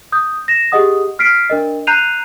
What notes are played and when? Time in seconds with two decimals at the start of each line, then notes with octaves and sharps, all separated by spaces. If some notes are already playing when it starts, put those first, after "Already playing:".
0.12 D#6 G6
0.48 A#6 E7
0.72 G4 G#4 D#5 F#5 D#6
1.19 F6 B6 C7 D7
1.50 D4 A#4 D#5
1.87 A#5 F#6 G6 C7 D#7 F7